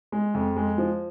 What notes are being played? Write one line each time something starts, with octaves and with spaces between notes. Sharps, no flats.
G#3
F2
G#3
F3